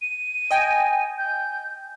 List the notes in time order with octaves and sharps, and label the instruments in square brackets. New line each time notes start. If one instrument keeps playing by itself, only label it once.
[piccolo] D#7
[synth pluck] D#5 G5 G#5
[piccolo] G6